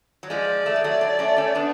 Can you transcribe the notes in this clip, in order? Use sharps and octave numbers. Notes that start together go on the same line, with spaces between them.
F#3
F3 G#3 D5
A3
G#3
F#3 A3
F#3
A3 C#4
A3 C#4
B3 D4